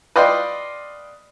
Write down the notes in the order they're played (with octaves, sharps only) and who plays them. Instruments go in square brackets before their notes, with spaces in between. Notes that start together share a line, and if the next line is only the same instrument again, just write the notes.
[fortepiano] B4 D5 D#5 F5 G5 C6